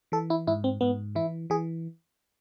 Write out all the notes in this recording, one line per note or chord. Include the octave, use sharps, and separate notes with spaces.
E3 A4
E4
G#2 E4
C4
G#2 B3
E3 E4
E3 G#4